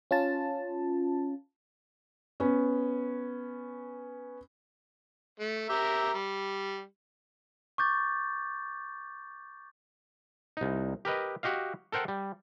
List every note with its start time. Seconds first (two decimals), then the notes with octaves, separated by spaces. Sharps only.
0.11 C#4 F4 A5
2.40 B3 C#4
5.40 A3
5.69 G4 A#4 E5
6.14 G3
7.78 C#6 D6 G6 A6
10.57 C2 D#4
11.05 G4 A#4 B4 D#5
11.43 F#4 G4 D#5 F5
11.92 A4 A#4 C5 F#5 G5
12.08 G3